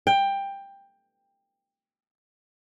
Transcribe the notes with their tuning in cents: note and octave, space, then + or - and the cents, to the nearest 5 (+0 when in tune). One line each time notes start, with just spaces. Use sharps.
G5 +15